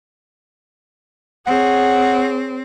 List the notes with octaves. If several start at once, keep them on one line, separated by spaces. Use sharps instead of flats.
C4 G#4 C#5 F#5